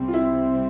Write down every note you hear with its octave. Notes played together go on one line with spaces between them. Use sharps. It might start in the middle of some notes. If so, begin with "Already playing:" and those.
Already playing: C2 C3 G3 C4
F4
E4